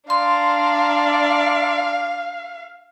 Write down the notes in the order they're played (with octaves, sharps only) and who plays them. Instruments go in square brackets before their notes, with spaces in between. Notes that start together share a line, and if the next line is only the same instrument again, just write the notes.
[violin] D4 A#5 [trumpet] D5 [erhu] F5 [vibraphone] C6